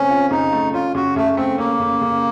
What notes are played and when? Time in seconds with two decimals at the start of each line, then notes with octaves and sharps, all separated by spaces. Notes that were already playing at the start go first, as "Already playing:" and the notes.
Already playing: C#3 A3 C4 C#4
0.10 F4
0.31 C#3 D#4
0.53 A3
0.73 C#4 F4
0.95 C#3 F#4
1.16 C#3 A3
1.37 A3 C4
1.58 A#3 C#4
1.80 C#3
2.02 C#3